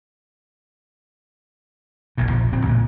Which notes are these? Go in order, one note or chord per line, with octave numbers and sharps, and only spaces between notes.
D#1 B1 E2 A2
A#1 F3
D1 C4
C#2 A#2 G#3